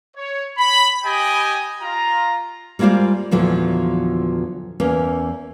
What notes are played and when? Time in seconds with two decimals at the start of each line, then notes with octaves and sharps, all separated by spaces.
0.15 C#5
0.57 B5
1.03 G4 D#5 G5 G#5
1.82 F4 A#5
2.79 G3 G#3 A#3 F4 C5 D5
3.31 E2 A#2 D3 F3 F#3
4.80 E2 A#3 C#4